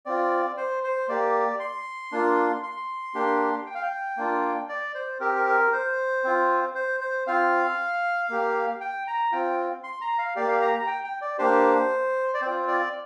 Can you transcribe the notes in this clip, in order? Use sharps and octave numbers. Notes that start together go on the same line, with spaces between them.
C4 F4 D5
C5
C5
A#3 G4 D5
C6
A#3 D4 F4
C6
A#3 D4 G4
G5
F5
G5
A#3 D4 F4
D5
C5
C4 G4 A#4
A#4
A#4
C5
C4 F4
C5
C5
C4 F4 F5
A#3 G4
G5
A#5
C4 F4 G5
C6
A#5
F5
A#3 G4 D5
F5
A#5
A#5
G5
G5
D5
A#3 D4 G4 C5
D5
C4 F4 C5
D5